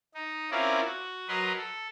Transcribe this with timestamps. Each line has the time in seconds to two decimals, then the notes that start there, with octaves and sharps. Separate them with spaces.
0.14 D#4
0.51 C4 C#4 E4 F4 A#4 D5
0.85 F#4
1.28 F#3 A#4 B4 D#5 C6
1.57 A4